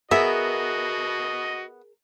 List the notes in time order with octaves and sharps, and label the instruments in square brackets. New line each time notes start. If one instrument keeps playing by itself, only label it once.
[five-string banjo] B3 E5 [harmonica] F#4 D#5 [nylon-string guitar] G#4 A#4